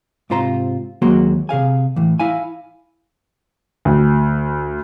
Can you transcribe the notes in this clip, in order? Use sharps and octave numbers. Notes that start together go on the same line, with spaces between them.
G#2 C3 F4 C5 A#5
D#2 F#3 G#3 A#3 F#4 C5
C3 G#4 F5 G#5
A2 E3
E4 F5 G#5
D2